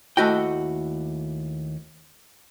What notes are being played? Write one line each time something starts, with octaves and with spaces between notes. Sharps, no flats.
D#2 A3 E4 F#4 D#5 G5